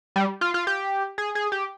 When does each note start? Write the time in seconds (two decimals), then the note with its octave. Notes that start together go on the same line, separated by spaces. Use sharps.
0.16 G3
0.41 F4
0.54 F4
0.67 G4
1.18 G#4
1.35 G#4
1.52 G4